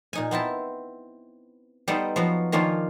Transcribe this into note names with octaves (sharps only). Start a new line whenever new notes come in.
A#2 D#4 G#5
B3 C4 E4 A5
G3 B3 D#4 A4 C5
F3 F#3 B3 F4 F#4
D#3 F3 A#3 C#4 D4 F4